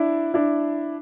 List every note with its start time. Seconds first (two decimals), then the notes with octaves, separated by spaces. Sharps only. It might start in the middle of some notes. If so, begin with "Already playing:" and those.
Already playing: D4 E4
0.34 D4 E4